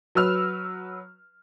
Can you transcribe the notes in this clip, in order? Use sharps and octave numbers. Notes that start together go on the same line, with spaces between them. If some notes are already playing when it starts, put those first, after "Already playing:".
F#3 B4 E6 F6